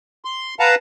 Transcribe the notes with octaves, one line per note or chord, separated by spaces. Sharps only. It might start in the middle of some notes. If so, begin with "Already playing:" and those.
C6
B4 F5 F#5 A5 A#5